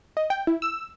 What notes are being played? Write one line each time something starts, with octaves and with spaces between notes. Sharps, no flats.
D#5
G5
E4
E6